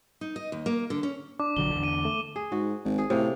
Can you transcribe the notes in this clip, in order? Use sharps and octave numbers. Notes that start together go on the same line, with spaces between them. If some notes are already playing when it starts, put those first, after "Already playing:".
D#4
D#5
D#2
A#3
D3
C#4
D4 D6
A#1 D3 F#3 G7
E2 D3
D#7
A3
G#4
G#2 F#4
G#1
G#4
A2 C3 A#3